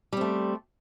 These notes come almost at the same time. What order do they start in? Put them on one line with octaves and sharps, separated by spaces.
G3 C4 A3